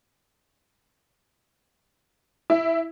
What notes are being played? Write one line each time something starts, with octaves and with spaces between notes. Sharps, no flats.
E4